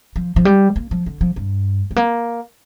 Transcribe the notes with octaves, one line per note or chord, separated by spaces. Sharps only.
F3
F3
G3
A#3
F3
D3
F3
G2
G3
A#3